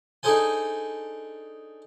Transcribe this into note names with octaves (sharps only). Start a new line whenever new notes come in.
D4 D#4 G#4 A4 C5 G#5